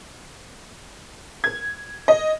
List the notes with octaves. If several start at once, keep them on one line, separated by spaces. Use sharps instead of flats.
G#6
D#5